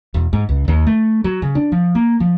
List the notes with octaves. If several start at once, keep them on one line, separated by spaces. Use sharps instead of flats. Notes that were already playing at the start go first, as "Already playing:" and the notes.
E1
G#2
C#2
D#2
A3
F#3
C#3
D4
F3
A#3
F3